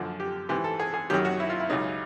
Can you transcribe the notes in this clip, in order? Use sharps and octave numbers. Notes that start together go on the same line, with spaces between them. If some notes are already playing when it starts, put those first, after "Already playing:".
Already playing: F#2 D3 F3
G4
G#2 E3 G4
A4
G#4
G#4
F#2 D#3 F#3 G4
F#4
E4
F4
E4
C#2 C#3 F#3 D#4